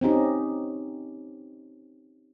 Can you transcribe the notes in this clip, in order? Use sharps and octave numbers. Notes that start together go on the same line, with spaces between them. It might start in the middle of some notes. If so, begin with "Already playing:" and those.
C4 C#4 D#4 G4